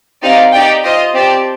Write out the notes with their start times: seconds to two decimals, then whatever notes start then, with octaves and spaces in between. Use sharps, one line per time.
0.22 C4 D#4 G4 D5 F5
0.52 D#4 G4 D5 G5
0.84 F4 C5 D#5
1.14 C4 G4 D5 A5